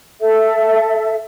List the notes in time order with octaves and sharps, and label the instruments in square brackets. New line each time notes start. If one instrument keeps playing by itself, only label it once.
[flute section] A4 E5